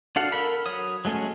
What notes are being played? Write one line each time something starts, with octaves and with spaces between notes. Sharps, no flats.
D4 F#4 A4 F5 F#5
A4 A#4 B5
F#3 C#5 D#6
F#3 G#3 A3 C#4 G#4